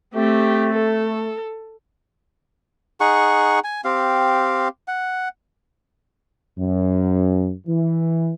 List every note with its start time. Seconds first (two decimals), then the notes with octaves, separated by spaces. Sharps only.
0.14 A3 C4 G4
0.74 A4
3.00 D#4 G#4 F#5 C#6
3.64 G#5
3.84 C4 G4 F5
4.88 F#5
6.59 F#2
7.67 E3